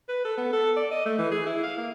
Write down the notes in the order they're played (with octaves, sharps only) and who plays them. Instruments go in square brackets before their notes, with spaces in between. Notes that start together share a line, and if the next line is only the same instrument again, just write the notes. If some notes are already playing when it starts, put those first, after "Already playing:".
[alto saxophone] B4
A4
B3
A4
D5
D#5
A3
E3
G#4
E4
F5
A#3